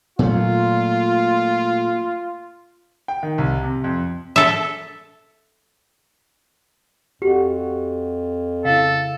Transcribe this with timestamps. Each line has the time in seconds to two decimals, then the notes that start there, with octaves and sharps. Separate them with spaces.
0.19 A#2 F#3 A3 F4
3.08 G5
3.23 D#3
3.38 C2
3.63 C3
3.84 F2
4.36 A4 E5
7.22 F2 F#4 G4
8.65 C#3 E4 A4 F5